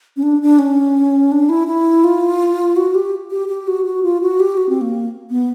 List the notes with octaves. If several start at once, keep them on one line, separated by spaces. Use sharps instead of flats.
C#4
D4
D4
C#4
D4
E4
E4
F4
F#4
G4
G4
G4
F#4
F#4
F4
F#4
G4
F#4
C4
A#3
B3